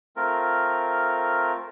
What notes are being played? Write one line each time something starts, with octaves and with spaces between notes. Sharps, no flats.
A3 C4 F4 A#4